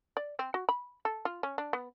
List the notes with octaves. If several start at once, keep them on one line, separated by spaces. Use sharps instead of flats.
D5
C4
F#4
B5
A4
F4
C#4
D4
B3